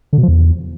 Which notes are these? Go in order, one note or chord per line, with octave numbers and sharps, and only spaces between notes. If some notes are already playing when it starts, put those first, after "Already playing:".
D3
B2
F3
E2